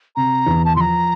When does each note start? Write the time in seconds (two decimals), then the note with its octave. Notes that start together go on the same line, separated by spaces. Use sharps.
0.16 C3 A#5
0.46 E2
0.65 A5
0.76 F3 A#5 C6